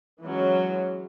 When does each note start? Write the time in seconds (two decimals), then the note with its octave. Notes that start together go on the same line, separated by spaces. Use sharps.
0.23 E3 F#3 G#3 C#4